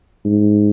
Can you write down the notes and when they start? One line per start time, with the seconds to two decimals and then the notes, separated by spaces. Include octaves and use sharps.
0.25 G#2